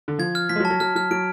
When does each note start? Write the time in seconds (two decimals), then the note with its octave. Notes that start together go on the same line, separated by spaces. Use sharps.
0.08 D3
0.19 F3 G#6
0.35 F6
0.49 F3 B6
0.56 G#3
0.60 F#3
0.65 A5
0.70 F#3
0.80 F#3 F6
0.95 F#3 F6
1.11 F#3 D7